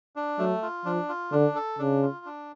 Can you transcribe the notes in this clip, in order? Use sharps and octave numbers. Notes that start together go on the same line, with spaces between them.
D4
F#3 A3
F4
F3 D4
F4
D3 D4
A4
C#3 D4
F4
D4